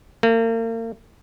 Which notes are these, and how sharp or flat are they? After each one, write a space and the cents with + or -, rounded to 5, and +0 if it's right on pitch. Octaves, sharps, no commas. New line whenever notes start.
A#3 -40